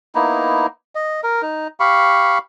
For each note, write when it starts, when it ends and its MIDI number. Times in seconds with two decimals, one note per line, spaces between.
0.15 0.66 58
0.15 0.66 59
0.15 0.66 63
0.15 0.66 64
0.95 1.21 75
1.23 1.42 70
1.42 1.68 63
1.80 2.38 67
1.80 2.38 77
1.80 2.38 83
1.80 2.38 85